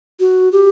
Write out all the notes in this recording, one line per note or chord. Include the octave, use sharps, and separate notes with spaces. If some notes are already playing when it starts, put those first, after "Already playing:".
F#4
G4